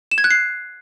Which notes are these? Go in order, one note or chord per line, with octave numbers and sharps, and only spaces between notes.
E7
G#6
F#6
C7